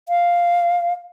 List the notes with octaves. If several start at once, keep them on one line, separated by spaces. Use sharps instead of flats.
F5